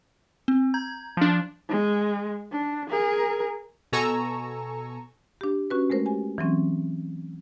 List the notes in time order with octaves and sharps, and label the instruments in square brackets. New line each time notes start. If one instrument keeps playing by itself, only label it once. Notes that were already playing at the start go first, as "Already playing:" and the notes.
[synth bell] C4
A#5 G6 G#6
[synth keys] F3 D4
[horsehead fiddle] G#3
D4
G#4 A#4
[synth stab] B2 A4 G#5 A#5 C#6 E6
[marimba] D4 G4
C#4 F#4 B4
G#3 A3 A#4 C5
G4 G#5
E3 F#3 C4 C#4